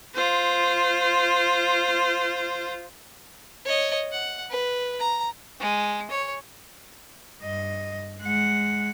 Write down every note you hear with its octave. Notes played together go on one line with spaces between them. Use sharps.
F4 C5
C#5 D#5
F#5
B4
A#5
G#3
C#5
G2 D#5
G#3 F#5